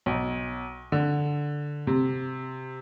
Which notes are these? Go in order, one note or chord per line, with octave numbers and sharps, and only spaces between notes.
B1
D3
C3